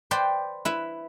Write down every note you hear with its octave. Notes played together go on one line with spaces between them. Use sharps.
B4 C5 D5 G5
E4 B4